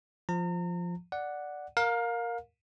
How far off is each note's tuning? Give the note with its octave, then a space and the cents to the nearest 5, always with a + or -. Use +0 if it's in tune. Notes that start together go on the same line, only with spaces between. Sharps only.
F3 +0 A#5 -40
D5 +0 F#5 +0
A#4 +0 F5 +25